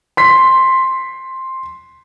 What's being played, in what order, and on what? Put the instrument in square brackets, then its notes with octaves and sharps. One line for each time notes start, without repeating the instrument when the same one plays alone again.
[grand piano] C6 B6